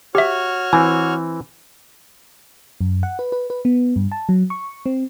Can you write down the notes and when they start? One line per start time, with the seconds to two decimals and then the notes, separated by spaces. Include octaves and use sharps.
0.15 F#4 G4 C#5 E5 F6
0.73 E3 C4 G#5
2.81 F#2
3.03 F#5
3.19 B4
3.32 B4
3.50 B4
3.65 B3
3.96 G2
4.12 A5
4.29 F#3
4.50 C#6
4.86 C4